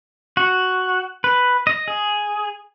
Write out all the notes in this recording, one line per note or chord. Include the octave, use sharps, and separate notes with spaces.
F#4
B4
D#5
G#4